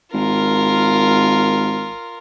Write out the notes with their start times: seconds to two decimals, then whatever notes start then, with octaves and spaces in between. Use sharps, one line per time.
0.14 G#1 F4 A#4